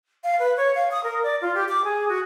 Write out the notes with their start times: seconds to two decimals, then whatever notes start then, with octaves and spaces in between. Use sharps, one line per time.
0.24 F5
0.39 B4
0.57 C#5
0.75 F5
0.91 D#6
1.04 A#4
1.23 D5
1.41 F4
1.55 G4
1.69 D6
1.84 G#4
2.09 F#4